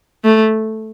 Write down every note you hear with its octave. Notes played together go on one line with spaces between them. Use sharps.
A3